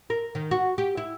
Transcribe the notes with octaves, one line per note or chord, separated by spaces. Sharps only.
A#4
D#3
F#4
G4
E4